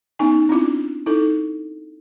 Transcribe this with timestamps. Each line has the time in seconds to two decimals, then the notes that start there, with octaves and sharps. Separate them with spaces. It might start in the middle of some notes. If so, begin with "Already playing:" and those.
0.19 B3 C#4 D#4 G#5
0.49 C4 D4 E4 F4
1.06 D#4 E4 A4